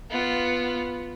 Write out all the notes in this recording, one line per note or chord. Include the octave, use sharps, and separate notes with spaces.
B3 F4